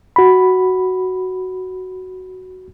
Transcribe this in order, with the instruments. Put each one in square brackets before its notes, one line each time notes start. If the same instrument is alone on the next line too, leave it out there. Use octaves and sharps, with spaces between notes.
[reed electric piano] F#4 B5